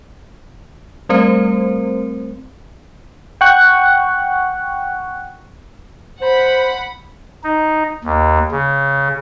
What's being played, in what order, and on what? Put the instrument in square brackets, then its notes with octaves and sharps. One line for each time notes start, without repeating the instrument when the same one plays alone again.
[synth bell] G3 A3 C4 A#4 C5
[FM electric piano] F#5 G5 C#6 F#6
[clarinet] C5 [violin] F#5 B5
[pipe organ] D#4
D#2
C#3